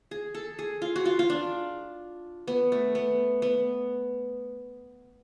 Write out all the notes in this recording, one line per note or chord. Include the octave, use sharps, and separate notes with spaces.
G#4
A4
G#4
F4
F#4
F4
F4
D4
B3
A3
B3
B3